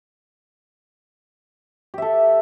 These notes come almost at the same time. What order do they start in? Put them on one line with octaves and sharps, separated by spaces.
G4 E5 A4